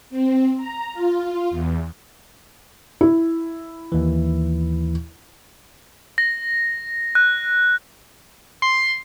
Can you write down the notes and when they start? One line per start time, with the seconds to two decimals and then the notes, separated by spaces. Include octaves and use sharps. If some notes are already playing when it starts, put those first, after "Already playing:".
0.10 C4
0.57 A#5
0.93 F4
1.50 E2
3.01 E4
3.92 D#2 E3
6.18 A#6
7.15 F#6
8.62 C6